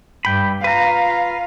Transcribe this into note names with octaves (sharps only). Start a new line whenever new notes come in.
G2 G5 B5
F4 B4 F5 A#5